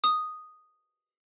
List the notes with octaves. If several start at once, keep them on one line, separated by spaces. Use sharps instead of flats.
D#6